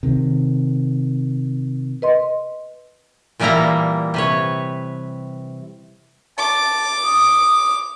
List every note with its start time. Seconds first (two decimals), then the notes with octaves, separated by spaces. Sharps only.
0.03 C3 D#3
2.02 B4 D#5 C6
3.40 A#2 E3 G3 A#3 E4 A#5
4.14 C3 B4 C#5
6.38 A5 D6
7.03 D#6